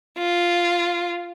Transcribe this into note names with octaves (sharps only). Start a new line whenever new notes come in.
F4